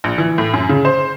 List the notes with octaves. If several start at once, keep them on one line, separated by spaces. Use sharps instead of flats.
A#1
E3
A2
F#2
C#3
C5